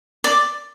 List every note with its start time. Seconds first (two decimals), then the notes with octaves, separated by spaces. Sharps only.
0.24 D5